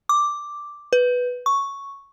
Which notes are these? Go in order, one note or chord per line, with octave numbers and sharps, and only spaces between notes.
D6
B4
C#6